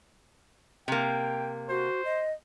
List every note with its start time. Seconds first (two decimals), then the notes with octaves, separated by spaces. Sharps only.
0.88 C3 A#3 G5
1.69 F#4 C5
2.05 D#5